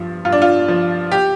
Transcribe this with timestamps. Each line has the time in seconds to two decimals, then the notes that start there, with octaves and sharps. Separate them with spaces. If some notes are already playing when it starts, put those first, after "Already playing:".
Already playing: G2 F3
0.25 G2 F4
0.32 D4
0.42 F4
0.68 F3
1.12 G4